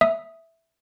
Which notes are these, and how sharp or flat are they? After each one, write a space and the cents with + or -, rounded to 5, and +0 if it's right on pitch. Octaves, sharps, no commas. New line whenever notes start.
E5 +0 D#6 +0